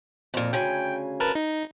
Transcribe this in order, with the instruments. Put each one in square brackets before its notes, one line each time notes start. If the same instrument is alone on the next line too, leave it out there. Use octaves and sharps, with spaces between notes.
[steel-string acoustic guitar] F2 A#2
[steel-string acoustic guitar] D2 C#3 G#5 [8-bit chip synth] G5
[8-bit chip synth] A#4 B4 A5
D#4